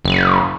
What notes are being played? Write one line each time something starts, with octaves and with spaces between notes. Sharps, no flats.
F#1